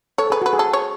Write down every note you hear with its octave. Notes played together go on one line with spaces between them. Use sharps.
A4 C#5
G#4 B4
F#4 B4
G#4
A4
C#5